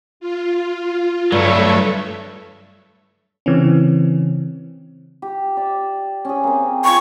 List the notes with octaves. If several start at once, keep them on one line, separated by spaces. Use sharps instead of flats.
F4
G2 F#3 A3 A4 C#5 E5
C#3 E3 C4 C#4
G4
D5 E5
C#4 G#4
A#3 C4
F4 A4 B4 C#6